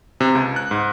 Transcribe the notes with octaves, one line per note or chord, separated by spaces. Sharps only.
C3
C#2
F#6
G#2